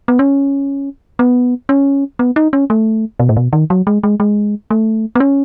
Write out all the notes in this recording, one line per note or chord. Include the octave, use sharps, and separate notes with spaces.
B3
C#4
B3
C#4
B3
D#4
C#4
A3
B2
A2
B2
D#3
F#3
G#3
G#3
G#3
A3
B3
C#4